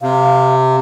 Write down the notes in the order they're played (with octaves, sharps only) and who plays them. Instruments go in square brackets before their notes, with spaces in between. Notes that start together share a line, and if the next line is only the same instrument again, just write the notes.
[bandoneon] C3 [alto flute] F5